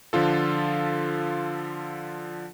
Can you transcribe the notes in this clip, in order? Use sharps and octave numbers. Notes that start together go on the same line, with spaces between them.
D3 F3 F4 A4